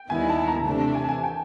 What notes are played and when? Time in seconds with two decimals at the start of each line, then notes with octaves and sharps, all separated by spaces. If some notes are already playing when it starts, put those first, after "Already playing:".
Already playing: G5
0.10 D#2 D#3 G3 B3 E4 G#5
0.29 A5
0.47 A#5
0.66 C3 E3 A3 D4 A5
0.95 G#5
1.04 A5
1.09 G#5
1.24 G5